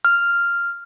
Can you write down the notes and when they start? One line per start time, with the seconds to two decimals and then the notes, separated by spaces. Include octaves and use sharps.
0.05 F6